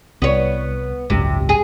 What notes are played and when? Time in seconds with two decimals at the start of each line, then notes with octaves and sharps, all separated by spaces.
0.22 C2 B3 C#5
1.10 G#1 C#2 F#2 C3
1.49 G#4